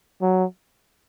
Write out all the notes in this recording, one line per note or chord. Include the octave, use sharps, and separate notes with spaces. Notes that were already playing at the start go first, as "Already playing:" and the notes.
F#3